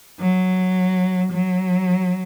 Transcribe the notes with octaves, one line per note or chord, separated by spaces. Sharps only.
F#3
F#3